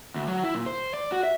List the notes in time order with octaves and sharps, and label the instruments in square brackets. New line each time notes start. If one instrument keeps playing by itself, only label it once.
[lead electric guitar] D2
F#3
E4
A#2
C5
D5
F#4
E5